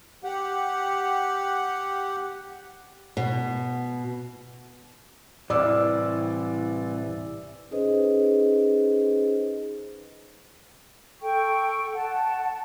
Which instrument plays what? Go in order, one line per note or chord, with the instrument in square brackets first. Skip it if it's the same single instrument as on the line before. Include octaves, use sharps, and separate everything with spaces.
[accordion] G4 F#5
[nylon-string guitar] B2
[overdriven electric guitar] C2 [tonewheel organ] A2 [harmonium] E3 [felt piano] D5 D6 E6
[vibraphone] C#4 D#4 G#4 B4 C5 D#5
[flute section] A4 G5 C#6
F#5 A5